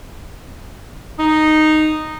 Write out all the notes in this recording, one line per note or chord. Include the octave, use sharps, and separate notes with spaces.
D#4